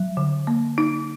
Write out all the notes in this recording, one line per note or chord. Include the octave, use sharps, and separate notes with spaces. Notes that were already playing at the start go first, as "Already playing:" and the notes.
Already playing: F#3
D3
A#3
D#4